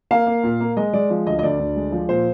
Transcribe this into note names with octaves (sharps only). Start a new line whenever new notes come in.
A#3 F5
A#3
A#2
A#3
G#3 D#5
G#3 D5
F3
D2 D#5
D#5
D2 D5
D2
G#3
F3
A#2 C5